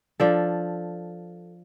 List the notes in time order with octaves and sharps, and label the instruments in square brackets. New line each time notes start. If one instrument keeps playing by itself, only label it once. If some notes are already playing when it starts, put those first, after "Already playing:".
[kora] F3 D4 A4